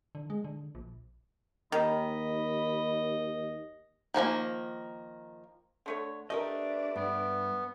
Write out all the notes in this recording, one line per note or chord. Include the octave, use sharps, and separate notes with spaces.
D3
G#3
D3
A#1
D#2 D#3 D#5 B5
D#3 F3 G#3 A#3
D3 A3 C#5
A3 D4 G4 A#4 B4 D5 D#5
G2 B3